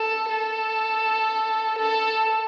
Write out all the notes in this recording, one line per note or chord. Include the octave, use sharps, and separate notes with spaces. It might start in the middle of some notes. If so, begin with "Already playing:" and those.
Already playing: A4
A4
A4